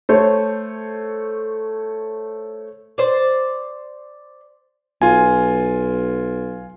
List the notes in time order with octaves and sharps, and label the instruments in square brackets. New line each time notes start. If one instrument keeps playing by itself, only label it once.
[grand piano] A3 C5 C#5
[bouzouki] C5 D5
[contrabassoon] B1 [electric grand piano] F4 G#5